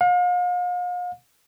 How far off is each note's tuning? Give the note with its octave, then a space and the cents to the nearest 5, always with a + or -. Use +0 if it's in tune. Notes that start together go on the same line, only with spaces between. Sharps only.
F5 +40